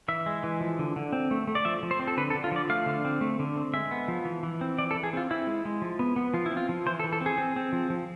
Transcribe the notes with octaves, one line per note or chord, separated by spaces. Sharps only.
E3 E5
G#3
E3
F3
D3
D3
C4
A3
A3
D5
F3 E5
F3
C5
C4
A4
D3 B4
A4
D3
F4
F3 D5
A3 F5
D3
C4
A3
D3
C4
G#3 E5
B3
F3
E3
E3
C4
E3 D5
A4
E3
G#4
C4 F4
C4 E4
G#3
G#3
F3
B3
B3
F3 F4
E4
C4
F4
F3
E3 C5
A4
E3
A4
C4
G#4
C4
C4
F3
F3